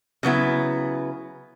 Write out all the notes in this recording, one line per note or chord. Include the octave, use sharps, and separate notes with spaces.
C#3 F#3 B3 E4